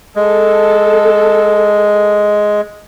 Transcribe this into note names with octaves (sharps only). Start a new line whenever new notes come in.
G#3 A4